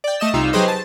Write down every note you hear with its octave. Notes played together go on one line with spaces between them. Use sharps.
D5 G5
A3 D#5 E7
C2 C3 D#4 F4 E6
F#3 G4 G#4 B4 C5 D#5
A5